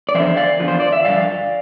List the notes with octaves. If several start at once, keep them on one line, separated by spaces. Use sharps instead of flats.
D5
E2 D3 F3 C5 E5
D5 F5
E2 D3 F3
C5
D5
E5
G2 D3 F3 D5 F5